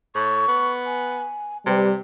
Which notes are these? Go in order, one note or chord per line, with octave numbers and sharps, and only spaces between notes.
A2 C#6
B3
G#5
C3 G3 B4